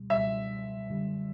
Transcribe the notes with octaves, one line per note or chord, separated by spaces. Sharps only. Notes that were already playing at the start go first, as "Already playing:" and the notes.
Already playing: C#2 B2 G3
C#2 B2 G3 E5
F#2 D3 G3